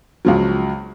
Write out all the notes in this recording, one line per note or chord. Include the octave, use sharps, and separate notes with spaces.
C#2 F3 F#3